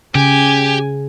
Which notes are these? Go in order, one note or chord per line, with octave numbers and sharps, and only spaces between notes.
C#3 G4 G#5